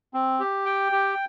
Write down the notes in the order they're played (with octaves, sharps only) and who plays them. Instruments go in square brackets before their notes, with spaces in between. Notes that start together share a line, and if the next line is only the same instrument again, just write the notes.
[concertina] C4
G4
G5
G4